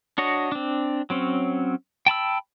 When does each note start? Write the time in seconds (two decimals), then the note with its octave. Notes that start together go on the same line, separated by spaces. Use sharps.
0.18 D4 F#4 C#5 D#5
0.52 C4 D4
1.10 F#3 C4 C#4
2.06 G5 A5 B5 E6